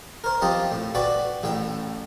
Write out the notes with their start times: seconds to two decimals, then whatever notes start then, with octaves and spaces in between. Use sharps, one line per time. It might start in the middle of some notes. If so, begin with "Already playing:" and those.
0.24 A#4 C5
0.42 F3 C4 G4 D#5
0.72 A2
0.95 F#4 B4 D5 G5
1.43 A1 A2 G5